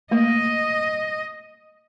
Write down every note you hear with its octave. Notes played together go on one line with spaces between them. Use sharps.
A3 A#3 D#5